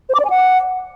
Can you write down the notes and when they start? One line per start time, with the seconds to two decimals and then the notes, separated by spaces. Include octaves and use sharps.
0.09 C5
0.14 D6
0.20 D5
0.25 G#5
0.30 F#5